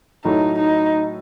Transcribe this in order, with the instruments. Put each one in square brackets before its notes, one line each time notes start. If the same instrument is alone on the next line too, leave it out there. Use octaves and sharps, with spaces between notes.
[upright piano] A2 F#3 A3 [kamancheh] D#4
[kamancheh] D#4